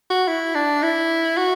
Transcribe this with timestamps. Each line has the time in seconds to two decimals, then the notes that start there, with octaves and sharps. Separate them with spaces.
0.10 F#4
0.28 E4
0.55 D4
0.83 E4
1.37 F#4